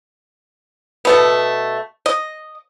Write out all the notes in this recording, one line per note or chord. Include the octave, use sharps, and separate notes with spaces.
B2 A3 B3
D#5